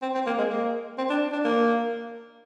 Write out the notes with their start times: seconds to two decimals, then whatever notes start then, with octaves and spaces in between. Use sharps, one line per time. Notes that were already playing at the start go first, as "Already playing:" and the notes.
0.02 C4
0.15 C4
0.27 A#3
0.38 G#3
0.50 A#3
0.98 C4
1.10 D4
1.33 D4
1.45 A#3